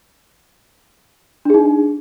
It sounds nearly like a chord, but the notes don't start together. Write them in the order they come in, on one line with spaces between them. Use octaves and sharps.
D4 G#4 D#4